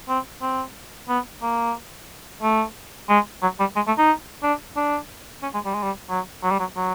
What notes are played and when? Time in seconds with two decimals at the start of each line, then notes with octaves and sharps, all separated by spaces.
0.09 C4
0.42 C4
1.09 B3
1.42 A#3
2.42 A3
3.09 G#3
3.42 F#3
3.60 G3
3.76 G#3
3.87 A3
3.98 D#4
4.43 D4
4.76 D4
5.43 C#4
5.54 G#3
5.65 G3
5.74 G#3
5.83 G3
6.09 F#3
6.43 F#3
6.51 G3
6.59 F#3
6.76 F#3